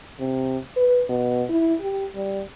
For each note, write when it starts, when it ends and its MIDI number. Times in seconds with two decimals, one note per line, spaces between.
0.20 0.57 48
0.76 1.03 71
1.09 1.44 47
1.49 1.74 64
1.81 2.06 67
2.15 2.42 55